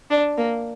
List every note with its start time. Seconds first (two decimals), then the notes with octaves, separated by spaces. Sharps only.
0.11 D4
0.38 A#3